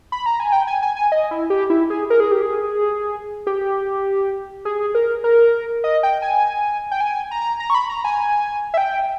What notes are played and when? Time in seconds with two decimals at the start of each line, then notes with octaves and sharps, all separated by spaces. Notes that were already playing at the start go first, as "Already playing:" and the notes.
0.12 B5
0.26 A#5
0.40 G#5
0.52 G5
0.67 G#5
0.83 G#5
0.97 G#5
1.12 D#5
1.31 E4
1.50 G4
1.70 E4
1.90 G#4
2.10 A#4
2.20 G#4
2.32 G4
2.42 G#4
3.47 G4
4.65 G#4
4.95 A#4
5.24 A#4
5.84 D#5
6.03 G5
6.22 G#5
6.91 G5
7.01 G#5
7.31 A#5
7.60 A#5
7.70 C#6
7.75 B5
7.90 A#5
8.04 G#5
8.74 E5
8.78 G5